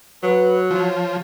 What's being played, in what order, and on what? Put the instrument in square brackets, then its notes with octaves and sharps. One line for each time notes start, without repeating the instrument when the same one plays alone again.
[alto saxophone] F#3 [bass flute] B4
[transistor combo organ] F3 [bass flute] C#5